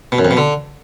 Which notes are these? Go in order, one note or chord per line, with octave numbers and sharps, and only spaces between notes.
B2
F#2
F2
B2
D3